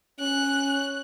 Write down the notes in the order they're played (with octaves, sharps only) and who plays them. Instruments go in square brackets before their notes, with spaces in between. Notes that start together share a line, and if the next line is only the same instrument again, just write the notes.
[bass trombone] C#4 [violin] F#6